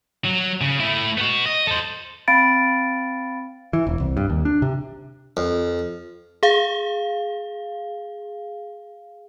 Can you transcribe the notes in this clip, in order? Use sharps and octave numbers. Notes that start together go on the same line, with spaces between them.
F#3
C#3
A3 E4
B3 F#4
D#5
A4 C5
C4 F5 B5 A6 D7
E3
E1
C2
G2
D#2
D4
C3
F2
G#4 F5